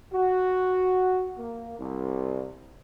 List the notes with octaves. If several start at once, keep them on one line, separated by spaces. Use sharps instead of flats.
F#4
A#3
C2